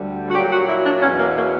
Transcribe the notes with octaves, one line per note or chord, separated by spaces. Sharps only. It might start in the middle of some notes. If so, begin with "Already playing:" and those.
Already playing: D2 D3 G3
F#4
A#2 F#3 G4
F#4
E4
D4
E2 B2 F#3 C#4
A#3
A#3